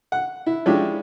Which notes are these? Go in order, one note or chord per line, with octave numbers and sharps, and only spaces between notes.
F#5
E4
F3 G#3 C#4 D4 E4 G4